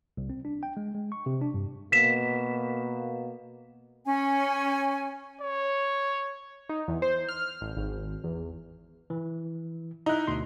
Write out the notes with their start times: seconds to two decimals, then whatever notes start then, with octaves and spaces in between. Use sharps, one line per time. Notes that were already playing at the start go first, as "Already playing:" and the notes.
0.17 C2
0.30 C4
0.45 D4
0.63 G5
0.77 G#3
0.95 G#3
1.12 C#6
1.26 C3
1.41 D4
1.54 G2
1.92 B2 A#3 B6 E7
4.06 C#4 G#5
5.41 C#5
6.69 D#4
6.88 E2
7.02 C5
7.29 F6
7.61 A1
7.77 G#1
8.24 E2
9.10 E3
10.06 D#4 E4 A#5 F#6
10.27 D2 B2 C6